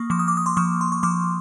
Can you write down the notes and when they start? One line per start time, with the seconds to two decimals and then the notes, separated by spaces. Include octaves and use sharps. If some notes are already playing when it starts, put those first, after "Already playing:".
Already playing: A#3 C#6 D#6
0.10 F3 D6
0.19 D#6
0.28 D6
0.37 D#6
0.46 C6 D6
0.56 F3 C#6 D#6
0.81 C6
0.92 C#6
1.03 F3 C6 D6